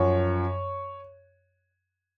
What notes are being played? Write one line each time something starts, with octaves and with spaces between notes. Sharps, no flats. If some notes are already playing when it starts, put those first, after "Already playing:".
Already playing: F#2 F3 C#5